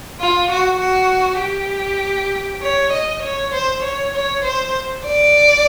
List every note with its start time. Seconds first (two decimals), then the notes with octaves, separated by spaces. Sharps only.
0.20 F4
0.51 F#4
0.80 F#4
1.41 G4
2.62 C#5
2.93 D#5
3.23 C#5
3.54 C5
3.84 C#5
4.14 C#5
4.45 C5
5.05 D5